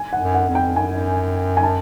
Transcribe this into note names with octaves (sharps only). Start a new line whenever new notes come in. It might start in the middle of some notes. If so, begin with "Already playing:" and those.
Already playing: G#5
F#5
F#2
F#5
F2
G5
F#2 G#5
G#5
A5